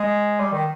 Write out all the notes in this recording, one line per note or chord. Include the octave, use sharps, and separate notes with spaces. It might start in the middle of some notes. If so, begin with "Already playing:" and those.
Already playing: G#3
G3
D#3